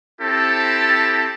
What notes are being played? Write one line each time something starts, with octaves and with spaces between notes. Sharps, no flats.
C4 E4 G4 A4 A5